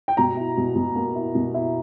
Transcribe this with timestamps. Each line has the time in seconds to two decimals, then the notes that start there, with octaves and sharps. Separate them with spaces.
0.08 G5
0.17 B2 A#5
0.37 E4
0.57 B2
0.76 B2
0.96 A#3
1.15 E4
1.35 B2
1.54 E4